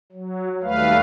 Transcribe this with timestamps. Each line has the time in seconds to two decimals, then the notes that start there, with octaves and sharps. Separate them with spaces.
0.12 F#3
0.63 D#2 G3 A3 B4 F5